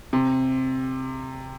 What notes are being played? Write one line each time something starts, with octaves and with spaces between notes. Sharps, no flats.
C3